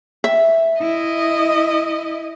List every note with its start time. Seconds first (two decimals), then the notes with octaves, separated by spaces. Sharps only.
0.24 E5
0.81 E4 D#5